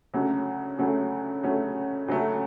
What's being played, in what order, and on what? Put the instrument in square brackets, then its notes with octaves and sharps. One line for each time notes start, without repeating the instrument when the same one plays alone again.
[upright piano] D2 C#3 F#3 A3 C#4
D2 C#3 F#3 A3 C#4
D2 C#3 F#3 A3 C#4
D2 C#3 F#3 A3 C#4